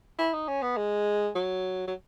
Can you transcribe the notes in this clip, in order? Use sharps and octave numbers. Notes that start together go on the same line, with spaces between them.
E4
D#4
C#4
B3
G#3
F#3
F#3